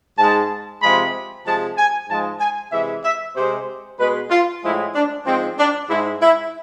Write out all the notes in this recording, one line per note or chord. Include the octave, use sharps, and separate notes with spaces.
G#2 G#3 A5
C3 F3 G#3 B5
C3 F3 G#3 A5
G#5
G#2 F3 G#3 A5
G#5
C3 E3 G#3 E5
E5
C3 G#3 C5
B2 G#3 B4
F4
A2 F3 G#3 E4
D4
G#2 F3 G#3 C4
D4
G#2 G#3 E4
E4